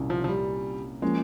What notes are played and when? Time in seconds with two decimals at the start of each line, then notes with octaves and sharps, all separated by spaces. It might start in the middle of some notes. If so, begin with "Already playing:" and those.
Already playing: C2 A#2 A#3 C#4
0.10 F3
0.24 F3
0.28 G3
1.02 F3 G#3 A#3 C#4